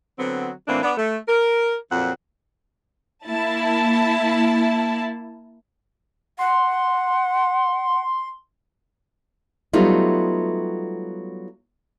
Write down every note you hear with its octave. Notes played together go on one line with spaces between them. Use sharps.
D3 F#3 B3 C4
A2 E3 A#3 C4 D4
B3 D4
A3
A#4
F2 A#2 F#3 C4 F#5
A#3 E4 A5
F#5 C6
F#3 G3 A3 B3 D#4 F4